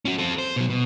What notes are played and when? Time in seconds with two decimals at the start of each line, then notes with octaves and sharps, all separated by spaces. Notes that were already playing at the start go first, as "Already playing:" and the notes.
0.05 C#4 F#4
0.18 C4 A4
0.38 C5
0.56 B2 F#3
0.70 B2